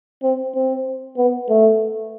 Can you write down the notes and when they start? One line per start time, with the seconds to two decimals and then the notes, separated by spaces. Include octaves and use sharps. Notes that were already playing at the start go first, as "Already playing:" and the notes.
0.23 C4
0.55 C4
1.17 B3
1.49 A3